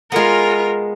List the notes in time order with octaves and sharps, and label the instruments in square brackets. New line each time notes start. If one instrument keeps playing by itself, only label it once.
[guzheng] G#3 B3 [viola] F4 A#4